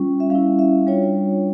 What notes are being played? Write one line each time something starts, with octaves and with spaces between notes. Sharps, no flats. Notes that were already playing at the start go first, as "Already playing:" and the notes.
Already playing: G3 C#4 F4
E5
G3 C#4 E4 F5
E5
G3 D4 F4 C#5